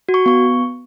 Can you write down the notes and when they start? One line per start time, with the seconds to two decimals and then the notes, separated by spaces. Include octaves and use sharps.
0.09 F#4
0.14 C#6
0.26 B3 C#6